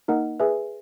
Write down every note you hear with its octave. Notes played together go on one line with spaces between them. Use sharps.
A#3 D#4 A#4 D#5 F#5
G#4 B4 E5 G#5